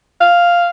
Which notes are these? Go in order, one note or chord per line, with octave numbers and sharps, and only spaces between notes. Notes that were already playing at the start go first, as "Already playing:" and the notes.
F5